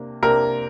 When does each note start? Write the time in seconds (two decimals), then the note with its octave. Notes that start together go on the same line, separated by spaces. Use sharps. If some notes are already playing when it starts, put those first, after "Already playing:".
Already playing: C3 A#3 D4
0.22 C3 A#3 D4 A#4